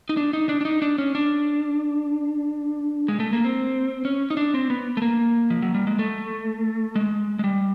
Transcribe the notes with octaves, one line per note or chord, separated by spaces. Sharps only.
D#4
D4
D#4
D4
D4
D#4
D4
C#4
D4
G#3
A3
A#3
C4
C#4
D#4
D4
C4
B3
A3
A#3
F3
F#3
G3
G#3
A3
G#3
G#3
G3